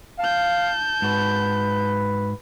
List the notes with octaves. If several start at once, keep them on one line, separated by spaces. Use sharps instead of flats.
F5 A5 G6
G#2 F#4 B4